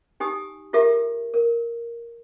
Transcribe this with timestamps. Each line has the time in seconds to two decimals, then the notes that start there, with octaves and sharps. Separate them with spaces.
0.20 D#4 G4 G#5 D#6
0.73 E4 F4 G4 A4 A#4 E5
1.34 A#4